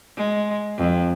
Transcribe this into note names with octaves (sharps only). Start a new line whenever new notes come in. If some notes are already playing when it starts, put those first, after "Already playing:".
G#3
F2